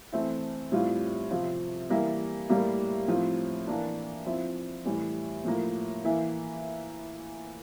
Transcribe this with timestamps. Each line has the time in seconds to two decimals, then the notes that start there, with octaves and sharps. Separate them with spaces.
0.12 E3 A3 C4 E4
0.72 A2 G3 C4 F4
1.31 C3 F3 C4 F4
1.90 E3 G3 A#3 E4
2.49 A2 G3 A#3 E4
3.08 A2 F3 C4 F4
3.67 E3 A#3 D4
4.26 F3 C4 E4
4.86 A2 E3 G3
5.45 A2 F3 A#3
6.04 E3 A#3 E4